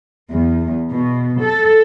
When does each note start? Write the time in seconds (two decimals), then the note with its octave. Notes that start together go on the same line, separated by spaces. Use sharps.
0.34 E2
0.94 B2
1.43 A4